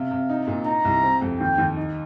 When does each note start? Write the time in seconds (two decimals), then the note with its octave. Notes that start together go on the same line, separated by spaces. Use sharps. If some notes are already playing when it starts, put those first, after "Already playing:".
Already playing: C3 F5
0.11 C3
0.29 D#4
0.47 A#2
0.66 D#4 A#5
0.85 C2
1.03 C4
1.21 F2
1.40 D#2 G5
1.58 D#2
1.77 D#4